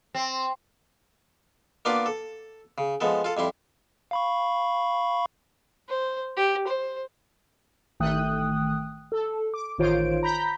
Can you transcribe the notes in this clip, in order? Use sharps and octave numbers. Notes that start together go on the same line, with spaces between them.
C4
A#3 B3 D4 F4 B4 D5
A4
C#3
F3 G#3 B3 A4
F4 A4
F2 G3 E4 C6
F5 B5 C#6
C5
G4
C5
A1 D#3 A3 G5 D#6 F#6
A4
D6
A1 D#3 F4 C5 C#5 D7
A#5 B5 G6 B6